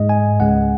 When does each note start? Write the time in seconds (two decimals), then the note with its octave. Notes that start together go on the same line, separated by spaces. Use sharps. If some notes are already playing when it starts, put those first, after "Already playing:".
Already playing: G#2 G#3 D#5
0.09 G#5
0.40 C#2 C#3 G#3 F#5